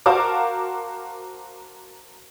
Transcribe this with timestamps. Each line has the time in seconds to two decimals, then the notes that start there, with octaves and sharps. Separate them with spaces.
0.06 F#4 A#4 C5 F5 A5 D6